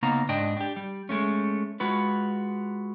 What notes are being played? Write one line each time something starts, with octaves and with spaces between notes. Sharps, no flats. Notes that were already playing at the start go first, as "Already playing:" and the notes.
C#3 A#3 B3 D#4 F5 A#5
G#2 D4 D#5 G5
D4 G4
G3
G#3 A3 C#4
G#3 F4 F#4 B4